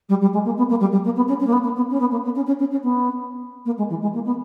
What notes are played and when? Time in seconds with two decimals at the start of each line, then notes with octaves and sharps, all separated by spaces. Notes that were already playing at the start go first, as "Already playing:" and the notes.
0.09 G3
0.21 G3
0.33 G#3
0.44 A#3
0.57 B3
0.69 A#3
0.80 G3
0.92 G3
1.04 A#3
1.16 B3
1.28 C#4
1.39 C#4
1.46 A#3
1.52 B3
1.63 A#3
1.76 B3
1.90 C#4
2.00 B3
2.11 A#3
2.23 B3
2.35 C#4
2.46 C#4
2.59 C#4
2.71 C#4
2.83 B3
3.65 A#3
3.77 G#3
3.89 E3
4.01 G#3
4.13 A#3
4.25 B3